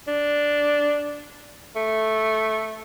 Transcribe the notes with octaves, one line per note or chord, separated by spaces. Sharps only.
D4
A3